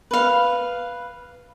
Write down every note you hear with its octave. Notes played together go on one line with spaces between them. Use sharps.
B4 F5